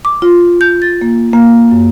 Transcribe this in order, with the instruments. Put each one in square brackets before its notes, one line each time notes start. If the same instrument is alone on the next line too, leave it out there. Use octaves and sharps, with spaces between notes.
[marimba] D6
F4
G6
A6
A#3
A#3
F#2